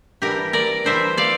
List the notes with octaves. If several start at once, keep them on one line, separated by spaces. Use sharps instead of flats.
E3 G3 D4 G4 A#4
A#4 D5
E3 G3 D4 C5 E5
D5 F5